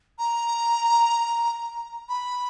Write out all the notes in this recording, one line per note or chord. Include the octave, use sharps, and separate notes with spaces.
A#5
B5